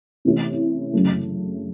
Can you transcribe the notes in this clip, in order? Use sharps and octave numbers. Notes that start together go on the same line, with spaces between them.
C3 E3 A3 C#4 E4
F#2 C#3 F#3 A3